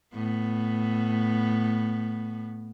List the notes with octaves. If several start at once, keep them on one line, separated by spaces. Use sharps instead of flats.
A2 B3